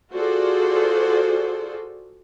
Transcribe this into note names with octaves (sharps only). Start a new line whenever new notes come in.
F4 F#4 G#4 A4 C5 D5